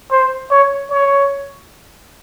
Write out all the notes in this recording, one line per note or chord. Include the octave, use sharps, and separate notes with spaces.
C5
C#5
C#5